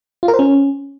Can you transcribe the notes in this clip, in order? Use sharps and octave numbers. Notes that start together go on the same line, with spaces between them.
F4
A#4
C5
C#4